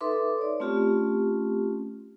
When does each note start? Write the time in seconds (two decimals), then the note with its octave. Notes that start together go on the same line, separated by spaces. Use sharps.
0.01 D#4 A4 B4 E5 C6 D6
0.38 C#5 D5
0.60 A3 C4 C#4 F4 G4